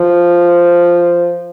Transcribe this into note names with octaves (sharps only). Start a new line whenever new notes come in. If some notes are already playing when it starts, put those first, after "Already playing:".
Already playing: F3